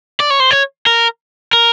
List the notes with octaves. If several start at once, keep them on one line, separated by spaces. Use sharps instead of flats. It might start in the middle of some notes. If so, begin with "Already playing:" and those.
D5
C#5
C5
C#5
A#4
A#4